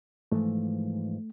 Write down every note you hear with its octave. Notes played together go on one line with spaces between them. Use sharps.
G#2 E3 F3 A3